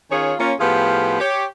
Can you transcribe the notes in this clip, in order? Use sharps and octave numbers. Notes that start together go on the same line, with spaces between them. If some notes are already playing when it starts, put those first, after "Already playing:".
D#3 C#4 F4 G#4 C#5
A#3 C#4 F4
A2 F3 B3 G4 G#4 F5
G4 C#5